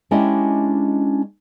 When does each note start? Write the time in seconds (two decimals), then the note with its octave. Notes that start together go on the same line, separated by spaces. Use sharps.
0.11 G#3 C#4 D4 E4 G4 D#5